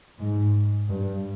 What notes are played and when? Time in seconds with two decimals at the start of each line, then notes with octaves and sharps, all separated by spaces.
0.19 G#2
0.88 G2